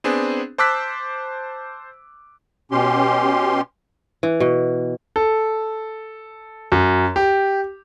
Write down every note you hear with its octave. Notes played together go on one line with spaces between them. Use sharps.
B3 C4 D4 G#4
C5 A5 D6 E6 F#6 B6
B2 C#4 G4 C6
E3
B2
A4
F#2
G4